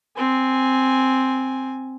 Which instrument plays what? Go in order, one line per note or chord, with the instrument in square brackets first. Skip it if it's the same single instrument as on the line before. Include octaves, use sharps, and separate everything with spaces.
[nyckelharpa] C4 G#5